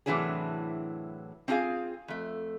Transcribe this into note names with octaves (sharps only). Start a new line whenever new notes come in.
A2 C3 E3 F#3 D4 G#4
C4 D4 F4 F#4 G#4 F5
F2 A3